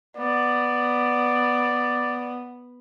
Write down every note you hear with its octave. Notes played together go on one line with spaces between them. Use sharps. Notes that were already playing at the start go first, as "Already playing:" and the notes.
B3 D5